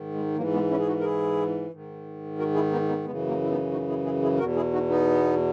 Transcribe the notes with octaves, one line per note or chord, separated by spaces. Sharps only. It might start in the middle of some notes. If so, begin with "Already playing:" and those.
Already playing: G#2 D#3
G#3
G#2 E3 F#3 A#3
G#3 B3
C#4 E4
G#4
D#4 F#4
A#4
E4 G#4
G#2 D#3
F#4 A#4
E4 G#4
B3 D#4
B3 D#4
F#2 C#3 E3 G#3 B3
F#3 A#3
E4
B3 D#4
D#4 F#4
E4 G#4
E4 G#4
E4 G#4
E2 B2 F#4 A#4
E4 G#4
D#4 F#4
B3 D#4